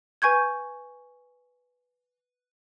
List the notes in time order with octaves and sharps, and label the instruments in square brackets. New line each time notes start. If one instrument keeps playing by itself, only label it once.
[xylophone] B4 G#5 C#6 G6 G#6